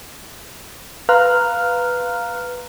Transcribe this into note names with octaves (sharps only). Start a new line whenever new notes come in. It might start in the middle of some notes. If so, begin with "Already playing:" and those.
B4 F5 A#5 C6 F6 F#6